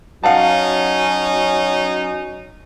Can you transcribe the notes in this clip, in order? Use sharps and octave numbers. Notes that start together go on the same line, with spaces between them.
F#3 C#4 D#4 F5 F#5 A5